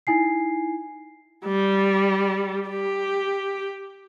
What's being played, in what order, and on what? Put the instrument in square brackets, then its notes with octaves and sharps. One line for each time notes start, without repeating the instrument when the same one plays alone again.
[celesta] D#4 E4 G#5 C7
[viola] G3
G4